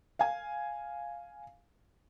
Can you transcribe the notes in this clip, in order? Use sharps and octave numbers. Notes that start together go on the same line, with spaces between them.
F5 G#5